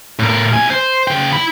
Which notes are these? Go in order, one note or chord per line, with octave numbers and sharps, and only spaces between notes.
A2 A#4
C2 G#5
C5
C#3 G5
E4 B5